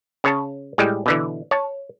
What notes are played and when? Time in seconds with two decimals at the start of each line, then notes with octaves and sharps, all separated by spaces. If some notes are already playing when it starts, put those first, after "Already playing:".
0.24 C#3 C#5 A5
0.78 A2 G3 G#3
1.06 B2 D3 E3
1.51 C#5 A5